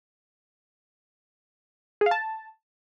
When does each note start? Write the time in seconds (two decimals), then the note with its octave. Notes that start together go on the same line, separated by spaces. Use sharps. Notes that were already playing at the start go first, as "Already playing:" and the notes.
2.01 G#4
2.06 F5
2.11 A5